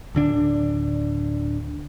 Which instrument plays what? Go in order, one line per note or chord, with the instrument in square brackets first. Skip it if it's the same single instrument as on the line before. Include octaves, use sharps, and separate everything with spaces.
[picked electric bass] D1 D3 D4